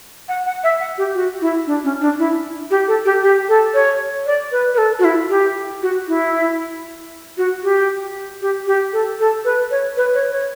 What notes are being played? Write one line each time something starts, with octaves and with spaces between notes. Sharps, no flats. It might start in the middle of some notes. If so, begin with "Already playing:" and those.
F#5
F#5
E5
F#5
G4
F#4
E4
D4
C#4
D4
E4
G4
A4
G4
G4
A4
C#5
D5
B4
B4
A4
F#4
E4
G4
F#4
E4
F#4
G4
G4
G4
A4
A4
B4
C#5
B4
C#5
C#5